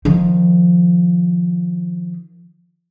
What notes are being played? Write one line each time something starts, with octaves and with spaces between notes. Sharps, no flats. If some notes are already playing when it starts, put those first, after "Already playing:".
D#3 F3